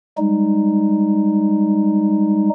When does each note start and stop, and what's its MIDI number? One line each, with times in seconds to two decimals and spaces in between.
0.18 2.50 55
0.18 2.50 56
0.18 2.50 63